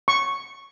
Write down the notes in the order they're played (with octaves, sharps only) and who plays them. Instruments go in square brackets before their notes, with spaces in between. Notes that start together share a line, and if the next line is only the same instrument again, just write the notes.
[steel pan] C#6